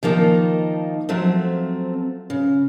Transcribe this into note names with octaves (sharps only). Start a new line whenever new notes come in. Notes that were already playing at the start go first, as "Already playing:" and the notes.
D#3 F3 A#3 D#4 A5
F3 F#3 A3 C4
C#3